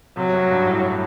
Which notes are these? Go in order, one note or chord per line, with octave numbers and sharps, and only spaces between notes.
C3 F#3
F#2
G2
A2